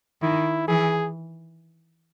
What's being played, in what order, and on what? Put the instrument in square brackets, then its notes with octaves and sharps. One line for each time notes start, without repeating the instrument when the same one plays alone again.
[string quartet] D#3 [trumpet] E4
[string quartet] E3 [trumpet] G#4